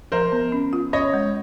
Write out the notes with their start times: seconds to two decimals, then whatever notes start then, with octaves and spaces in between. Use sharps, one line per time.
0.12 F3 A#4 C5
0.32 B3
0.52 C#4
0.73 F4
0.93 C#4 C#5 D#5
1.14 G#3